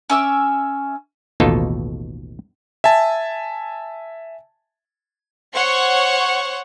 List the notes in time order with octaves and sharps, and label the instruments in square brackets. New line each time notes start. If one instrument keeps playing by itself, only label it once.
[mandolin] C#4 E5 D6
[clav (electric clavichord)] A1 D#2 B2 D#4 F4 A4
[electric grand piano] E5 G#5 A5
[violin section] C5 C#5 F#5 C#6